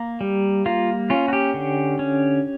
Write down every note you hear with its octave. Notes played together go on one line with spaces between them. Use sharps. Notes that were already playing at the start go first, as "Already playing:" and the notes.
Already playing: A#3
G3
A#3 F4
C#4 F4
F#4
G4
D3
C#4